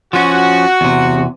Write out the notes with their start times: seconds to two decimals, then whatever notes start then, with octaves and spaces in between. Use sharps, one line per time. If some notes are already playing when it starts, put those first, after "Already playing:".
0.13 F3 C#4 F#4
0.81 E2 C3